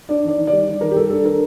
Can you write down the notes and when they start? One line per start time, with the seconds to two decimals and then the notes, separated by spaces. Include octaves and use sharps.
0.09 D4 D5
0.24 D#3 D5
0.37 D#3
0.47 G3 D5
0.67 D#3
0.81 D#3 A#4
0.91 G4
0.96 G3 A4
1.10 D4 A4
1.25 D4 A#4